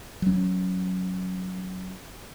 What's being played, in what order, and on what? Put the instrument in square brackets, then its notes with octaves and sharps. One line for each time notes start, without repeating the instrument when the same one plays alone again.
[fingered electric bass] F#3 C#4